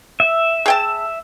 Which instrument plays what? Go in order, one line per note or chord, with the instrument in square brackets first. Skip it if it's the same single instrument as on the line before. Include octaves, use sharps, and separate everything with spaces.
[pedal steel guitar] E5
[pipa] G#4 G5 A5